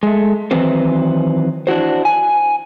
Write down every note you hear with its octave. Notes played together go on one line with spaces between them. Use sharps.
G#3 A3
D#3 E3 F#3 C4 B4 C5
D4 E4 F#4 C5
G#5